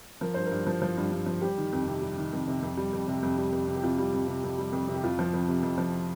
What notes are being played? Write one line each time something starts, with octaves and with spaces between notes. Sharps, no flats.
F3 A#4
G2 C5
A#4
G2
F3
F3
G2
G2
F3
G3 G4
D#3
F2
C3
G3
D#3
F2
C3
F2
G3
F2
C3
F2
G3
F2
C3
G4
F2 F4
G3
F2
C3
F2
G3
F2
C3
G4
F2 F4
F3
F2
C3
F2
F3